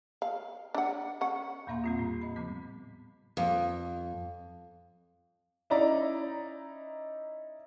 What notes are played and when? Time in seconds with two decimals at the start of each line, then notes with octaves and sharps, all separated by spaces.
0.22 F5
0.75 D4 F#5
1.21 C#4 F#5
1.67 E2 A#2 A#3 E5 A#5 C6
1.84 G3 C4 F4
1.99 A2
2.21 D#5 B5
2.36 C#3 F3 G3 B3
3.37 F2
5.70 C#4 D#4 E4 D5 A#5